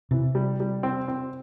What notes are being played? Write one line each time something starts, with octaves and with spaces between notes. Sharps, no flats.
C3 E3
G3
G3
C4
C4